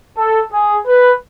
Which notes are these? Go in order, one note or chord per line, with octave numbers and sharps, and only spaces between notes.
A4
G#4
B4